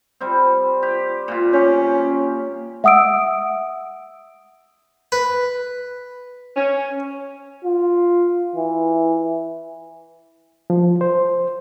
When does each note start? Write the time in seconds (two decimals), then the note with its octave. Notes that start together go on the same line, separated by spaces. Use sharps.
0.21 G3 C4
0.83 G4
1.28 A#2 F4
1.53 C#4 G4
2.84 E5 F#5 D#6 E6 D7
5.12 B4
6.56 C#4
7.65 F4
8.56 E3
10.70 F3
11.01 C5